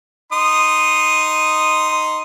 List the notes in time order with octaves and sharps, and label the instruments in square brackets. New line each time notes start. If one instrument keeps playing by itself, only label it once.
[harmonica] D#4 C6 D#6